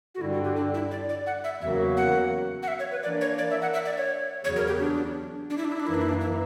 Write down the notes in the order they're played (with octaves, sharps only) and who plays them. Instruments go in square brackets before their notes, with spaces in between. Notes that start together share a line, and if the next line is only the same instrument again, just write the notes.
[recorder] F#4
[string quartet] G2 D3 G3 [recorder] E4
[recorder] F#4
G4
D4
E4
D5
D5
F#5
E5
[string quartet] E2 C#3 F#3 A#3 C#4 [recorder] E5
[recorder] F#5
F#5
E5
C#5
B4
[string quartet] E3 A#3 D4 [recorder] D5
[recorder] C#5
D5
E5
F#5
E5
D5
C#5
[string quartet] E2 C#3 F#3 [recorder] C#5
[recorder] A#4
G4
D4
D4
E4
D4
E4
D4
[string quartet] F#2 E3 A#3 [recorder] E4
[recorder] D4
E4
D4
E4